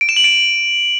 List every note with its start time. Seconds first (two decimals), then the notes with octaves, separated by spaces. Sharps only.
0.01 D7
0.09 E7
0.16 F#7
0.24 D7